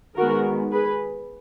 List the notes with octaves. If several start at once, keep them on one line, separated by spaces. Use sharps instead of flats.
D#3 G#3 B3 F#4 A#4
G#4 B4